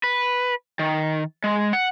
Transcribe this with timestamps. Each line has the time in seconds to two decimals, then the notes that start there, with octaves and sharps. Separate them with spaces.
0.03 B4
0.79 D#3
1.44 G#3
1.73 F#5